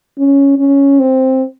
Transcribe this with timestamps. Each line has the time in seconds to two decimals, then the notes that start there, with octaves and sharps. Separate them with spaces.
0.18 C#4
0.59 C#4
1.00 C4